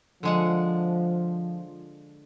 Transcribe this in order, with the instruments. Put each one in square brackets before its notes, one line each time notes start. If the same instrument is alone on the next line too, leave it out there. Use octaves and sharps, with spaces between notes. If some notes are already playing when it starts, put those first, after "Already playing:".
[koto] D3 G#3 F#5 [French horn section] F3